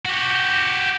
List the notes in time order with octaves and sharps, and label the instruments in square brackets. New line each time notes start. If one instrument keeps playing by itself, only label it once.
[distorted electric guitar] F#4 G4